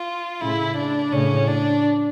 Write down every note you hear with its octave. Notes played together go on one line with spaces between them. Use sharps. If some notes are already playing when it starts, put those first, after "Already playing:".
Already playing: F4
A2 C#3 E4
D4
A2 C#3 C#4
D4